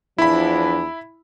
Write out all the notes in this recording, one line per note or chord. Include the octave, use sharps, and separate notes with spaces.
E2 F3 D4 E4 B5